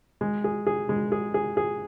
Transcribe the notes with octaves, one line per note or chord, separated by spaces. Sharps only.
G#3
G#4
G#4
G#3
G#4
G#4
G#4